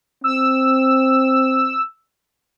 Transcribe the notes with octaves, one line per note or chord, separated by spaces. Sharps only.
C4 E6